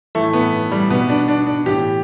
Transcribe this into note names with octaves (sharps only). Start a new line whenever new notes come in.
A2 E3 A3
B3
G3
B2 B3
D4
D4
D4
A2 E3 G4